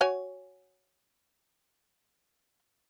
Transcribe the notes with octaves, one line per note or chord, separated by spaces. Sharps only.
F#4 C#5 G#5